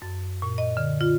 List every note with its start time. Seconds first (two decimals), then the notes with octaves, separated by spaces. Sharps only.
0.02 F#2
0.42 A#2
0.58 D#5
0.77 D3
1.01 F4